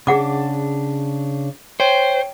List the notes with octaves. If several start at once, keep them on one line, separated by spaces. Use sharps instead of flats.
C#3 D4 G#4 F#5 D6
C5 C#5 G5 C7